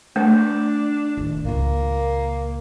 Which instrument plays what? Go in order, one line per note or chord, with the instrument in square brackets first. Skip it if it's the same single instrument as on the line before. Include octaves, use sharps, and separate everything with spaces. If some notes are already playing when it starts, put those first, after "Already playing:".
[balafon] A3 [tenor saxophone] D4
[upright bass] D1 D#2
[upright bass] C#2 A#2 [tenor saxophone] A#3